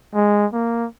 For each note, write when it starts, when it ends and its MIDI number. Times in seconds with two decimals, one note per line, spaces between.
0.15 0.46 56
0.53 0.86 58